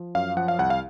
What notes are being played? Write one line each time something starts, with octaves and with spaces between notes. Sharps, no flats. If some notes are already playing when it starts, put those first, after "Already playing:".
Already playing: F3
F#2 F5
F3 F#5
F5
C2 F#5
F5